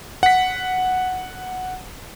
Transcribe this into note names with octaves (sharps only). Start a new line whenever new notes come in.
F#5 B6